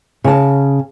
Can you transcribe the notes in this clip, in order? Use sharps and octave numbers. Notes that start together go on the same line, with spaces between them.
C#3 A5